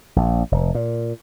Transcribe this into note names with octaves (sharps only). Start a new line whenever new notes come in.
A#1
F1
A#2